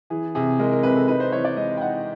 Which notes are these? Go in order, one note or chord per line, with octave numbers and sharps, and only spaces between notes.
E3 G#4
C3 G#4
G#3 A#4
A#4
C3 B4
A4
D#4 B4
C5
E3 C#5
D5
G#3 D#5
G5
D#4 F#5